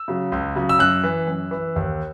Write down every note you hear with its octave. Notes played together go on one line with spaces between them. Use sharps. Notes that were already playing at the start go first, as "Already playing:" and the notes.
Already playing: E6
C#3 F#3
C#2
C#3 F#3
E6
F#2 F#6
E3
F#2
E3
D#2